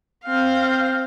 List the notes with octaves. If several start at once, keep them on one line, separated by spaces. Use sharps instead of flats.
C4 F5